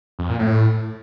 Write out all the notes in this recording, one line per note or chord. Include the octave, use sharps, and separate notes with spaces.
F2
A#2
A2